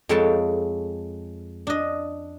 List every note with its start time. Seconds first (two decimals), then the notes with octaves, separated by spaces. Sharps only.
0.09 F2 G#3 A4 C#5 G5 A5
1.67 D4 D#5